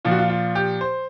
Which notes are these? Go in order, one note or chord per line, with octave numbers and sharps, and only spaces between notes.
A#2 F3 F4
F#4
F4
F4
G4
C5